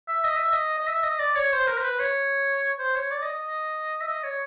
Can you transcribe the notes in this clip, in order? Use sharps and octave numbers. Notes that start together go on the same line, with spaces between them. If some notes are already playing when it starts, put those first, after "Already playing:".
E5
D#5
E5
D#5
D#5
E5
D#5
D5
C#5
C5
A#4
C5
B4
C#5
C5
C#5
D5
D#5
D#5
E5
D#5
C#5